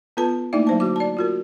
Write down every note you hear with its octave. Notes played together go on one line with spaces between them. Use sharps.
B3 F4 A4 B4 A5
A3 A#3 D#4 E4 D5 E5
F#3 C5 A5
D3 F#4 D6
D5 A5
F4 F#4 A#4